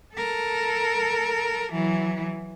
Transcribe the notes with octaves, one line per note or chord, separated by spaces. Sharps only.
A4 A#4
E3 F#3